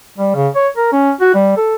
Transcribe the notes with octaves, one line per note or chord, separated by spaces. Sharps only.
G3
C#3
C#5
A#4
C#4
F#4
G3
A4